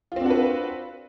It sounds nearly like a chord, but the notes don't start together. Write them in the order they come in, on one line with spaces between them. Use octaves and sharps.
F4 C4 D4 F#4 B4